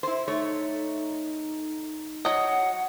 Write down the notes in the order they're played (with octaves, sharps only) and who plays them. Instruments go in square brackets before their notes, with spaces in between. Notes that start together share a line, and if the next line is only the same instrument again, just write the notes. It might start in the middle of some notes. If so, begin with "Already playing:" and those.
[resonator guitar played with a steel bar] E4 C5
[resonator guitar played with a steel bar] A3 C#5 [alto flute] D#4
[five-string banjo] F#3 D#5 [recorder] F#5